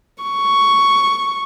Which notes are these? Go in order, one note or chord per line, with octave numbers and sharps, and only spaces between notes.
C#6